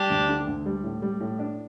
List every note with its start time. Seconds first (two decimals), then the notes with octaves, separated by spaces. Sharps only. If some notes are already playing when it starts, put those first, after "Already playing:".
Already playing: G3 D4 G4
0.10 D2
0.29 D3
0.47 D2
0.66 G3
0.84 A2
1.02 G3
1.20 A2
1.39 D4